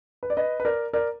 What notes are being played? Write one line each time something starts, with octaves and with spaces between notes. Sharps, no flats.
B4
D5
B4 D#5
B4
A#4 D5
A#4 D5